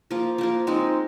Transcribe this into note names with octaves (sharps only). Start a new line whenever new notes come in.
F3 A#3 F4
F3 A#3 F4
F3 G#3 C4 D#4